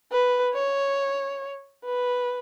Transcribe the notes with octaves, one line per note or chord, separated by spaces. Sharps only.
B4
C#5
B4